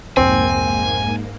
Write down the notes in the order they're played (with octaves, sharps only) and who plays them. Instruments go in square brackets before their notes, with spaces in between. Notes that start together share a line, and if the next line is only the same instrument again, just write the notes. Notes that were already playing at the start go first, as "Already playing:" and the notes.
[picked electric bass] C2 F2 [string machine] G#2 A#3 [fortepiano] C4 [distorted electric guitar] G#5